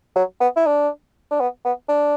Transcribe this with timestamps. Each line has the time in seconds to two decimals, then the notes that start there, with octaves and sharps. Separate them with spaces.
0.16 F#3
0.41 B3
0.56 E4
0.66 D4
1.31 D4
1.40 B3
1.65 B3
1.89 D4